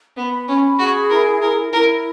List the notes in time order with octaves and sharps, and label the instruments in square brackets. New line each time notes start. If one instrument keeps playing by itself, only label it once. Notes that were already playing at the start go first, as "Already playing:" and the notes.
[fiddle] B3 [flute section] B5
[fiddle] C#4 [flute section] B5
[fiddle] F#4 [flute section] G#4
[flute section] E4 [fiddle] A#4
[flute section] E4 [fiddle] A#4
[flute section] E4 [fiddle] A#4